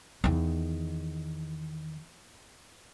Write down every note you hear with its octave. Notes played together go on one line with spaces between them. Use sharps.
E2 D#3